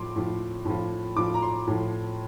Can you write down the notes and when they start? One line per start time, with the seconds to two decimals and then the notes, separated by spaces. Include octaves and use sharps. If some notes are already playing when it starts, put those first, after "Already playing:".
Already playing: A2 F3 C6 D6
0.16 A2 F3
0.65 A2 F3
1.16 A2 F3 D6
1.34 A#5
1.42 C6
1.67 A2 F3